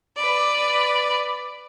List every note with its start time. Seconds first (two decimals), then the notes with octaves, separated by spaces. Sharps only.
0.17 B4 D5